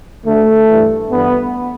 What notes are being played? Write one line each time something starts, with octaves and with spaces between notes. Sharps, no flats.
D2 D3 A3
G2 E3
G2 E3 B3